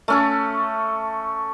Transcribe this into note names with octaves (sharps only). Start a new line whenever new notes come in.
A3 C#4 A4